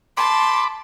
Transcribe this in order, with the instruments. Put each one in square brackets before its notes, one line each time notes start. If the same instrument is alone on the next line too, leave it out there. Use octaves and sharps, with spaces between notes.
[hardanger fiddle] A5 [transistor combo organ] B5 D6 [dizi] C6